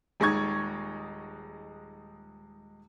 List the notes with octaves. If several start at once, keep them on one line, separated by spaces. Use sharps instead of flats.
D#1 G#3 D#4 C#6 G#6